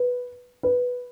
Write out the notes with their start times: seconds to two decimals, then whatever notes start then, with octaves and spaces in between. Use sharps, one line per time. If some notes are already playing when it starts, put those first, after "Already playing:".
Already playing: B4
0.63 B4